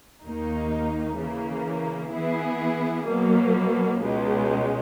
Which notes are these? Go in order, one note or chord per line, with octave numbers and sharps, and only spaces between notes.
D#2 D#3 A#3 D#4
C#3 E3 A#3
E3 B3 E4 G#4
B2 F#3 A#3
C#2 B2 G#3